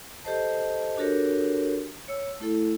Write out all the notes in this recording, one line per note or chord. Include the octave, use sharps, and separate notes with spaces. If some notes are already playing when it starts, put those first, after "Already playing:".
G4 A4 C5 D#5 A5
D4 F#4 G4 A4 A#4 C#5
C#5 E6
A3 E4 A4